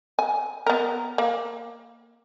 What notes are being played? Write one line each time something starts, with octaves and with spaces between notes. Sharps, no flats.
G#5
B3 A#4
A#3